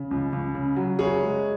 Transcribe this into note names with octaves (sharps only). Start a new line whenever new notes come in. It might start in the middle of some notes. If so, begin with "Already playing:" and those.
Already playing: C#3
C#2
C#2
C#3
F#3
F#1 G#4 C#5
G#3